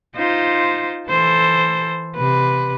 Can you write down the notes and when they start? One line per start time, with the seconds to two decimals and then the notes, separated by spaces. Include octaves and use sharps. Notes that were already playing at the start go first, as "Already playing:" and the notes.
0.16 D#4 F4 C5
1.10 E3 A4 C5
2.16 C3 B4